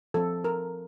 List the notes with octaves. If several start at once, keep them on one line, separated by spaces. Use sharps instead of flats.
F3 C4 A4
A#4